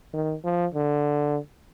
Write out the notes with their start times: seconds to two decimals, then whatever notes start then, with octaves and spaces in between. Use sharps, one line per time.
0.13 D#3
0.44 F3
0.74 D3